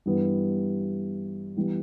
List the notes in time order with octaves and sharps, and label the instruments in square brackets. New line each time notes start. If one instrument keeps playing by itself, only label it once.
[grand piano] G2 E3 G3 B3
E3 G3 B3